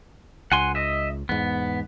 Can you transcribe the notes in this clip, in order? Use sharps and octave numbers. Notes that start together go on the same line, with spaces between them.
C#2 F#5 G#5 C6
D#5 E5
E2 G#2 B3